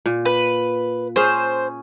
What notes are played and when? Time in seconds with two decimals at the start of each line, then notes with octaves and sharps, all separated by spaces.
0.06 A#2
0.25 B4
1.16 C#4 G#4 C5